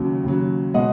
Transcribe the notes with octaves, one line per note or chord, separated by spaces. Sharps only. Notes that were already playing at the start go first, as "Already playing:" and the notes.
Already playing: D#2 C#3 F#3
D#2 C#3 F#3
B2 G#3 D#5 F#5